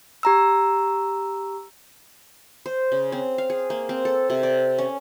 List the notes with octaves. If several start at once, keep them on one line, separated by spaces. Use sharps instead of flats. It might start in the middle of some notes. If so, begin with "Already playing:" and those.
G4 A#5 E6
C5
C#3
C4
F5
G#4
A#3
C4
A4
C3
D5
C#4